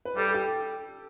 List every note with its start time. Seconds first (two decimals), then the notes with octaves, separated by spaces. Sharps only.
0.05 B4
0.17 G3 A4
0.28 A4
0.34 G4